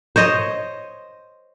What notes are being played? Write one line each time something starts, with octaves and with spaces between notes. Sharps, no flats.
C5 C#5 D#5